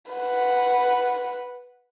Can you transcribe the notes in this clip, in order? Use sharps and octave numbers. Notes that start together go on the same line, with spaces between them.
B4 F#5